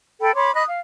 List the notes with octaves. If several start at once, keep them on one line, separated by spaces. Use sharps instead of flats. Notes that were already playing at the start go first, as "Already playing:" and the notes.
A4 G5 B5
C#5 B5 C6 D6
D#5 B5 D#6 F#6
F5